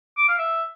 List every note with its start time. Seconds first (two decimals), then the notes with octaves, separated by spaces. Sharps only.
0.17 D6
0.28 F5
0.38 E5